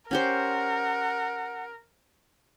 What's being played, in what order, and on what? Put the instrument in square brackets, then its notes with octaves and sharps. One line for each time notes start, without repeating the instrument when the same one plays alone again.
[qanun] C#4 G4 C5 [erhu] A#4 [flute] F#5